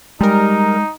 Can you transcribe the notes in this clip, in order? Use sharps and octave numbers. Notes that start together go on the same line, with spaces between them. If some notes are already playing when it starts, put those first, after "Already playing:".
G3 G#3 D#4 A#4